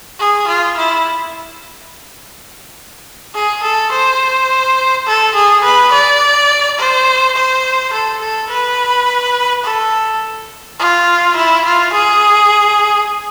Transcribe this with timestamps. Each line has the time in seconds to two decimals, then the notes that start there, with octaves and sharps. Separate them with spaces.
0.20 G#4
0.48 F4
0.77 E4
3.34 G#4
3.63 A4
3.92 C5
5.07 A4
5.35 G#4
5.64 B4
5.92 D5
6.78 C5
7.36 C5
7.93 A4
8.21 A4
8.50 B4
9.64 A4
10.79 F4
11.37 E4
11.65 F4
11.93 G#4